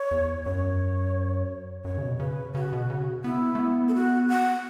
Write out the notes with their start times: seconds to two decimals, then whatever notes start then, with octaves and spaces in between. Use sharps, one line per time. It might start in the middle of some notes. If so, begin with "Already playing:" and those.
Already playing: C#5
0.11 E2
0.46 F#2 C#5
1.85 F#2 C#5
1.98 C#3
2.02 B2
2.20 C#3 B4
2.55 C#3 F#4
2.73 B2
2.90 C#3
3.24 B3 E4
3.55 A3
3.59 B3
3.88 A4
3.95 F#4
4.29 F#5